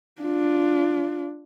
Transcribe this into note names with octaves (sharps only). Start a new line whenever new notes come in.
D4 F4